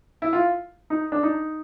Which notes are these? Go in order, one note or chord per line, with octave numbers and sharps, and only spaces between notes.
E4
F4
D#4
D4
D#4